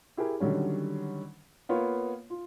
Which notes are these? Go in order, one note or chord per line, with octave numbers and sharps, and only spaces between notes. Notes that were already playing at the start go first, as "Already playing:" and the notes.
E4 G4 G#4 A#4
D3 D#3 F#3 G3 C#4
A#3 B3 F4 A#4 C#5
F4